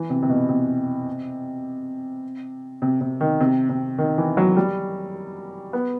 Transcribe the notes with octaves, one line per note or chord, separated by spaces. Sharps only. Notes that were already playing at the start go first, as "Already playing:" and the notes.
Already playing: E3
C3
C3
B2
C3
C3
C3
D#3
C3
C3
D#3
E3
F#3
G3
B3